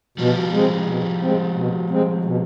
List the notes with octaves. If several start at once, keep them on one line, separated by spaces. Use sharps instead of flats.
B2 F3 G3
G#3 C4
B2
G#3 C4
B2
G#3 C4
B2